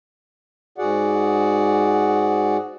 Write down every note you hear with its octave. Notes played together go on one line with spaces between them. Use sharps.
G#2 F#4 G#4 D5 F#5